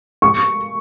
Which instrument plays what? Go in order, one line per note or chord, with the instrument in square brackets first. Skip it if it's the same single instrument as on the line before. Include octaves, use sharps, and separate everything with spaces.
[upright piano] C#6